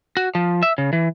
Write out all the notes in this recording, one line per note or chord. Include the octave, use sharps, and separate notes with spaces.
F#4
F3
E5
C#3
E3